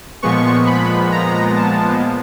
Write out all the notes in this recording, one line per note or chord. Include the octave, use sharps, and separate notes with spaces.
A#2 F3 G#3 B3 C#6
B5
A#5
A5